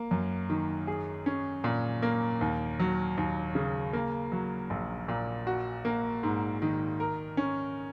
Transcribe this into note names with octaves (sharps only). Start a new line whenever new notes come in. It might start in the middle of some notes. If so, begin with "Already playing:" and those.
Already playing: A#3
F#2
D#3
G#4
C#4
A#2
A#3
D#2
F#3
D#2
C#3
A#3
F#3
A#1
A#2
F#4
A#3
G#2
D#3
A#4
C#4